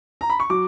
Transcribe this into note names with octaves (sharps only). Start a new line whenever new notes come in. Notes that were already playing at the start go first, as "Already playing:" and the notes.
A#5
B5
C#6
F#3 D6